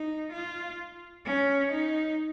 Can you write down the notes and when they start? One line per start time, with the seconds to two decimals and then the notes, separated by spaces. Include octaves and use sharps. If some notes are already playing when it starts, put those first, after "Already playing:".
Already playing: D#4
0.32 F4
1.26 C#4
1.72 D#4